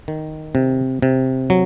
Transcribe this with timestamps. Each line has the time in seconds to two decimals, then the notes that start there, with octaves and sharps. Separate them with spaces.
0.08 D#3
0.55 C3
1.02 C3
1.50 F#3